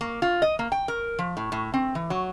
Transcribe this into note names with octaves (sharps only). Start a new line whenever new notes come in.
A#3
F4
D#5
A#3
G5
A#4
F3
A2
A2
C4
E3
F#3